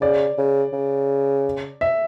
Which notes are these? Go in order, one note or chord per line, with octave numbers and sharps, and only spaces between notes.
C#3 D5
C#3
C#3
E5